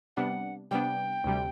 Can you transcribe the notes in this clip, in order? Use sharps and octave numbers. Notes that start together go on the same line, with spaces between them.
C3 G3 B3 D4 F#5
C3 G3 B3 D4 G5
D2 C3 G3